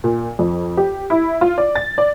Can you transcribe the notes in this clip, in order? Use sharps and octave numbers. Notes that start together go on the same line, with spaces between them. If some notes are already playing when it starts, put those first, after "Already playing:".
A#2
F2
G4
E4
F4
D5
A6
D5